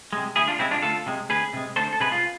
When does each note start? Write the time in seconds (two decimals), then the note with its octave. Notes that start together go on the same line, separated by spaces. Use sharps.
0.13 C3 G#3
0.36 D2 E4 G#4
0.48 D4 F4
0.59 C3 G#3 C4 E4
0.71 D4 F4
0.82 D2 F4 A4
1.06 C3 G#3
1.29 D2 G#4 B4
1.53 C3 G#3
1.76 D2 A4 C5
1.93 A4
2.00 C3 G#3 G#4 B4
2.12 F4